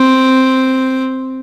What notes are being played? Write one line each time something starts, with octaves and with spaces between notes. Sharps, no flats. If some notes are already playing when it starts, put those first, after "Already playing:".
Already playing: C4